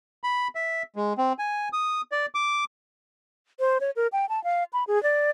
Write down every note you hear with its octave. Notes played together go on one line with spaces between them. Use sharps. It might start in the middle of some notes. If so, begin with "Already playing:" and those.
B5
E5
G#3
C4
G#5
D#6
D5
D6
C5
C#5
A#4
G5
A5
F5
B5
G#4
D5